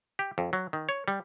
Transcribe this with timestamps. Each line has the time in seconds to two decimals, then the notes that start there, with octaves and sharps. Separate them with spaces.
0.19 G4
0.38 F2
0.53 F#3
0.73 D#3
0.89 C#5
1.08 G3